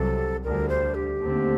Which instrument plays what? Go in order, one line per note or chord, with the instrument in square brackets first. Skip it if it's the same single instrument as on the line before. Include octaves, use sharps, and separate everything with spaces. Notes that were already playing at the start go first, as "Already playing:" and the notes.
Already playing: [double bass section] C2 C3 F#3 [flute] A4
[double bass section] D2 D3 G3 [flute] A#4
[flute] C5
G4
[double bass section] D#2 D3 A3 C4